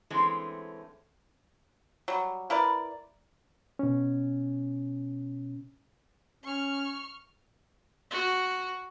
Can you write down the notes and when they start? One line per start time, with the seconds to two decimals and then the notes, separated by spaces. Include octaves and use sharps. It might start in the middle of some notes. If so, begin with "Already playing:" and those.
0.10 D3 E3 G#3 A3 C4 C#4
2.08 F#3 G3
2.50 E4 A#4 B4 D5
3.79 B2 C#4
6.44 C#4 C#6 F6
8.11 F#4